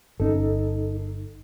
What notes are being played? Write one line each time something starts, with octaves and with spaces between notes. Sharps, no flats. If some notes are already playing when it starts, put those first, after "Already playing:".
G1 C#4 D#4 A4